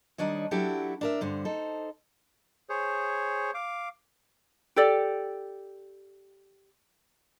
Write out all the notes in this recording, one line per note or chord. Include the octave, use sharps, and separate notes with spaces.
D#3 G3 D4 C#5 D#5
F#3 D4 E4 F#4 G4 A4
D4 A#4 E5
G2 D3 C5
D#4 A4 C5
G#4 C5 C#5
F5 D6
G4 A4 D5